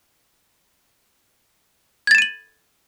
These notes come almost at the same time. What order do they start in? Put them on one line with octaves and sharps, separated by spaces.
G#6 A6 E7 D#7 F#7